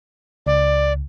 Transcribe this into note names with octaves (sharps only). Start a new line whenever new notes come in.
C#2 D5